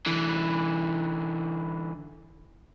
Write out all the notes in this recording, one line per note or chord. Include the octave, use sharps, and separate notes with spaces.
D3 E3